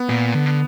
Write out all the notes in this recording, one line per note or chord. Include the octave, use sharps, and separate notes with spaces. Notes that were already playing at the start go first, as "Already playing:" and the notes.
Already playing: B3
A#2
D3